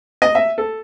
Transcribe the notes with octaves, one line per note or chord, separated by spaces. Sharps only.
D#5
E5
A4